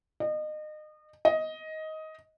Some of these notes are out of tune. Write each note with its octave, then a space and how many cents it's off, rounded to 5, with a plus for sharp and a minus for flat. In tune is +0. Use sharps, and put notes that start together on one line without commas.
D#5 -30
D#5 +15